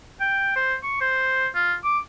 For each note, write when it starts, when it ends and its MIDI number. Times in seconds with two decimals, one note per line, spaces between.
0.20 0.55 79
0.56 0.75 72
0.84 0.96 85
1.01 1.47 72
1.55 1.75 65
1.84 1.99 86